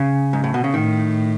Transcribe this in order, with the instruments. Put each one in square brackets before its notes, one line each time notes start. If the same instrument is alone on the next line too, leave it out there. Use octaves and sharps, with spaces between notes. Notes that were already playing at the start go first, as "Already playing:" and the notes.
Already playing: [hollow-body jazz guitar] C#3
G#2
A2
B2
C#3
[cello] A2 [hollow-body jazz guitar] D#3